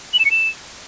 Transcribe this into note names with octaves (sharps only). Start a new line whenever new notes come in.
F#7
E7
C#7
E7